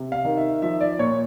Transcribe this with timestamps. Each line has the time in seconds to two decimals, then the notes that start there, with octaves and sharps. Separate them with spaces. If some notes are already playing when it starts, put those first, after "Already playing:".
Already playing: C3
0.12 F5
0.25 D#3
0.37 E5
0.62 F3 E5
0.81 D5
0.99 A#2 C#5